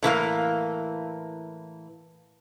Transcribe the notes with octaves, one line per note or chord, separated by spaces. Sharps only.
A2 E3 A#3 F5